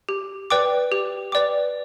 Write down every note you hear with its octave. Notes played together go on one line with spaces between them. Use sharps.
G4
B4 D5 G5 D6
G4
B4 D5 G5 D6